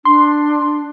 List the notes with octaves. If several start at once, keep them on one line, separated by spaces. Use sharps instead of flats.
D4 C6